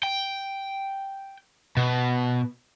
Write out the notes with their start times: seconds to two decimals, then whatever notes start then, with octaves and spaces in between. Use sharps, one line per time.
0.03 G5
1.77 B2